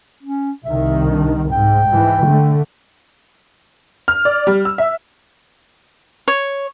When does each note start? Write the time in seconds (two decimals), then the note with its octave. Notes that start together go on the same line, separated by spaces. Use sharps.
0.23 C#4
0.65 C2 D#3 E5
1.05 D4
1.52 G#2 G5
1.90 G#2 E3
2.25 D3 A3
4.08 F6
4.25 D5
4.47 G3
4.65 E6
4.78 E5
6.28 C#5